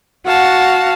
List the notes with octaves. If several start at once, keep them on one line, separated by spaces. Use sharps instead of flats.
F#4 F5 F#5 A5